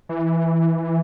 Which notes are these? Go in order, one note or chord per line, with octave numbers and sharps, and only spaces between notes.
E3